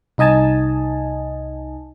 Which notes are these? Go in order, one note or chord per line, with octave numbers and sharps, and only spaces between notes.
C2 D#4 D#5 G#5 A5